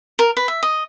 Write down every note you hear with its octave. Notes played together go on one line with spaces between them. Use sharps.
A#4
B4
E5
D#5